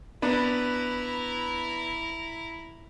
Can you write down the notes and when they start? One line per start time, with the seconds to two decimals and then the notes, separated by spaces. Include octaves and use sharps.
0.22 B3 D4 E4 B4 A#5